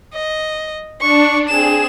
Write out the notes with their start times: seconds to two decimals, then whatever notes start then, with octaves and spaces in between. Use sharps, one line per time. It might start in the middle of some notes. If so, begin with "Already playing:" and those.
0.13 D#5
1.01 D4 C#6
1.49 C4 G#4 E7